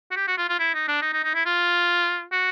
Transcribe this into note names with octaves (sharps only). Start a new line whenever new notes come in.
F#4
G4
F#4
F4
F4
E4
D#4
D4
D#4
D#4
D#4
E4
F4
F#4